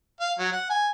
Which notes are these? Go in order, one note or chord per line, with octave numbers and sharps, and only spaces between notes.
F5
F#3
F#5
G#5